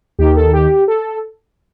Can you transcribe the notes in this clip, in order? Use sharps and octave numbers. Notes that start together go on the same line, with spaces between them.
D#2 D#3 G4
A4
G4
A4